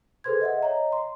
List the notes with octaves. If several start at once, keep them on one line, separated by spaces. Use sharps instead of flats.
G#4 A4 B4 C5 C6 G#6
D#5 E5 F#5
C#5 D#5 A#5
C6